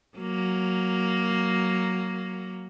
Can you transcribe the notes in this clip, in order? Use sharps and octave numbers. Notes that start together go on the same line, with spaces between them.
F#3 A#3